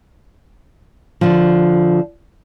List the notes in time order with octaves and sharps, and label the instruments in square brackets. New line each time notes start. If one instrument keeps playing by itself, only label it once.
[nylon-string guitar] D3 F3